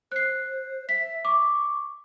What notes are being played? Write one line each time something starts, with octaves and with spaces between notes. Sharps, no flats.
C5 F#6 C7
E5 B6
C#6 D6